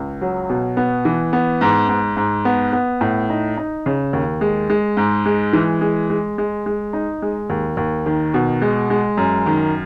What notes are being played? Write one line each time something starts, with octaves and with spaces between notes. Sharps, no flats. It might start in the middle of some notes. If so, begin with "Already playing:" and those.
Already playing: C#2
F#3
B2
B3
E3
B3
G#2
G#2
G#2
B3
B3
A2
D#4
D#4
C#3
D#2
G#3
G#3
G#2
G#3
E3
G#3
G#3
G#3
G#3
D#4
G#3
D#2
D#2
D#3
B2
G#3
G#3
F#2
D#3